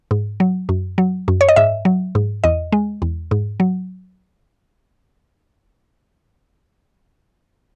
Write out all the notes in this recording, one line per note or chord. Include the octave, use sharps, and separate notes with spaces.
G#2
F#3
F#2
F#3
F#2
C#5
D#5
G#2 E5
F#3
G#2
E2 D#5
G#3
E2
G#2
F#3